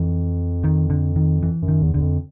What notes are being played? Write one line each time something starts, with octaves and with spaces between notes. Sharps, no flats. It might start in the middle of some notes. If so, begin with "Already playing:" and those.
Already playing: F2 E3
D#3
D3
D#3
E3
F#2
D#3
E2
E2 D3
F2